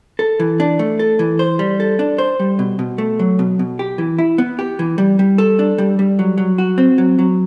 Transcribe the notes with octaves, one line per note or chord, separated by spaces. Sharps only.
A4
E3
D4
A3
A4
E3
C5
G3
A4
D4
C5
G3
B2
B2
A3
F#3
B2
B2
G4
E3
E4
B3
G4
E3
G3
G3
A4
D4
G3
G3
F#3
F#3
F#4
C4
F#3
F#3